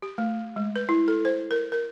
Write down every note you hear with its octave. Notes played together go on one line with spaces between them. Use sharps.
G4
A3
G#3
B4
E4
A4
C5
A#4
A#4